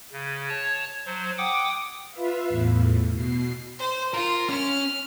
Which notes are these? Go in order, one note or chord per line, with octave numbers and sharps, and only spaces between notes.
C#3
C#5 A5
F#3 C5
F#5 G5 D6 D#6
F4 B4 E5 F5
E2 A2
B2 C7
C5
F4 A#4
C#4 F6